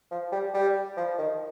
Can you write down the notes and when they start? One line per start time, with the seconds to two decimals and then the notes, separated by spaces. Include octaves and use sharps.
0.11 F3
0.32 G3
0.54 G3
0.97 F3
1.18 D#3